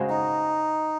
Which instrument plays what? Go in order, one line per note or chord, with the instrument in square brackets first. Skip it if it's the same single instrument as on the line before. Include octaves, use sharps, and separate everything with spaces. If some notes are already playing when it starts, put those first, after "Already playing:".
Already playing: [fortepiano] C#3 G#3 C4 F#4
[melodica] D#4